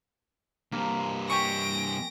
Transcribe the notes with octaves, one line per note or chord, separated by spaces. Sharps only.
G2 C3 A#3
G4 G#5 C#6 A#6 D7